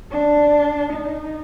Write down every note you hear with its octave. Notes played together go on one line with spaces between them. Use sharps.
D4
D#4